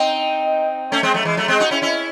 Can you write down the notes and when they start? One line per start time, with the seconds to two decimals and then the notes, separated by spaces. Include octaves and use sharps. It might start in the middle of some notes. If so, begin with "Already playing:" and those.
Already playing: C4 D#4
0.92 A3 C#4
1.03 G#3 C4
1.14 F#3 A3
1.25 E3 G#3
1.37 F#3 A3
1.48 G#3 C4
1.60 D#4 F#4
1.71 C#4 E4
1.82 C#4 E4